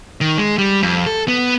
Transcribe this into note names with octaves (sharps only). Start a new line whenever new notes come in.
D#3
G#3
G3
F2
A4
B3